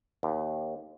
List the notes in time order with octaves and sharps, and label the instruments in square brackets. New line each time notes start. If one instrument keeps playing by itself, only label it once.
[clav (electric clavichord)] D#2